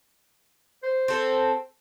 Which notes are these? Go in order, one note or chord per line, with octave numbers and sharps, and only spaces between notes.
C5
C4 A4